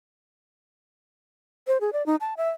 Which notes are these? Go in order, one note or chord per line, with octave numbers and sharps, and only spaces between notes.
C5
G#4
D5
D#4
A5
E5